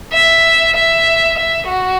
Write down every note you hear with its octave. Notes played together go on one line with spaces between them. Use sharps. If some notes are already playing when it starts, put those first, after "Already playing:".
E5
E5
E5
F#4